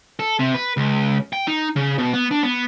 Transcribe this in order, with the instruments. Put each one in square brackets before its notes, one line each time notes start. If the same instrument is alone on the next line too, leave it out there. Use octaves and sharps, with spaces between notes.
[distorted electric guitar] A4
C3
B4
C#2
G5
D#4
C#3
B2
B3
D4
B3